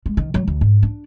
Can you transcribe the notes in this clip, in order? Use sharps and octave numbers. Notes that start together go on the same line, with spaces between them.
G#3
D#3
F#3
D2
G#2
D4